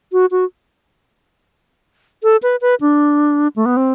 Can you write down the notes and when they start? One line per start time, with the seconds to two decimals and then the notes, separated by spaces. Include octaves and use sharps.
0.12 F#4
0.31 F#4
2.23 A4
2.43 B4
2.61 B4
2.81 D4
3.56 A3
3.66 B3
3.77 C4